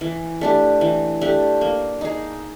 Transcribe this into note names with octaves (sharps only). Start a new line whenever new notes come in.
E3
A3 D4 G4
E3
A3 D4 G4
A#3
D#4 G#4